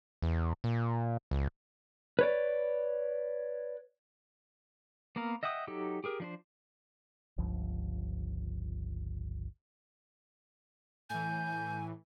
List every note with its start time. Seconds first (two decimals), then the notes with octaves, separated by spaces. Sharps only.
0.22 E2
0.64 A#2
1.31 C#2
2.19 B4 C#5 D5
5.16 A#3 B3 A#4 F5
5.43 D#5 E5 F#5 G5 D#6
5.67 F#3 D#4 G4 A4
6.04 G4 G#4 A#4
6.20 F3 D4 C5
7.38 G1 C#2 F3
11.10 A2 E3 G#5 G6